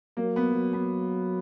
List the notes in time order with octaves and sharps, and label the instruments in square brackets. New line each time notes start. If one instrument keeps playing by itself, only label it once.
[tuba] F#3 [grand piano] A#3
[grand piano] B3
[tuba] F#3
[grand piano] B3